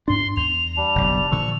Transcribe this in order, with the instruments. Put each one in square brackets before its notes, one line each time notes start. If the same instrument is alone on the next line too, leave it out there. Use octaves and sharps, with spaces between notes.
[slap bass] G#2 D4 [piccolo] C6
[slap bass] E2 [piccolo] F7
[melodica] G3 D4
[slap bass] F#1 B1
[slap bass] A#2 D3 F3 [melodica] C#6 E6